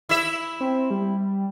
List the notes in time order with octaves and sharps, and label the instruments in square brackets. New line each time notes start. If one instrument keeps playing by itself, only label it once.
[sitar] E4 E5
[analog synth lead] C4
G3